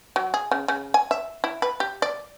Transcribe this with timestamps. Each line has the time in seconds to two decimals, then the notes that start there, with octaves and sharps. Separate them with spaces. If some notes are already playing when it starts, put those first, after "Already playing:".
0.16 F#3
0.34 G#4
0.51 C#3
0.68 C#3
0.94 G#5
1.11 E5
1.44 E4
1.62 B4
1.80 G4
2.02 D5